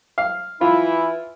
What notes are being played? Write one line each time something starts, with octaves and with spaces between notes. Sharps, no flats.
F5
E3 E4 F4